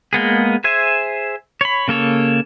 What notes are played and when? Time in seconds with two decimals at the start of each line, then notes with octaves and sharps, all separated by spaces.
0.13 G#3 A#3 B3 G#4
0.64 G#4 C5 E5 G#5
1.61 C#5 B5
1.88 C#3 A#3 A4 C#5